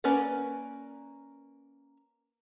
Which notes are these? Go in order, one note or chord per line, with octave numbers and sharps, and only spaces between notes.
A#3 C#4 B4 D5 F#5